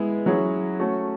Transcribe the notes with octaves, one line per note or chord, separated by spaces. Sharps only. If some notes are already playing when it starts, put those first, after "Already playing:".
Already playing: G#3 B3 E4 G#4
F#3 C#4 E4 G#4
A3 C#4 F#4